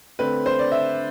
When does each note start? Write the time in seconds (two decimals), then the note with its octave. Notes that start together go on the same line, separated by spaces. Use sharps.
0.19 D3 A3 C4 B4
0.46 C5
0.59 D5
0.72 E5